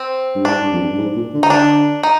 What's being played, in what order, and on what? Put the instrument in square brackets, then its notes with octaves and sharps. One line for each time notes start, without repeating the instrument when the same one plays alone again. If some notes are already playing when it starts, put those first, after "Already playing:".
Already playing: [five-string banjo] C4
[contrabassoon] G2
[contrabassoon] G#2 [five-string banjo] D4
[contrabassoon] G2
F2
G2
G2
G#2
A#2
D3
[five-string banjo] D#4
[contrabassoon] D3 [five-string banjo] D4
[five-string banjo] D#4